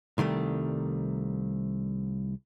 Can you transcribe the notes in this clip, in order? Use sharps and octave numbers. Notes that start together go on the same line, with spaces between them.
C2 D#3 G3 A3